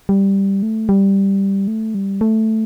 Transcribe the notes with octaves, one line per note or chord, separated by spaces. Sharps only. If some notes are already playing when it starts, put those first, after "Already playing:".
G3
A3
G3
A3
G3
A3